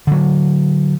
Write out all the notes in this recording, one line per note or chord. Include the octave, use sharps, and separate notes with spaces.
D3 F#3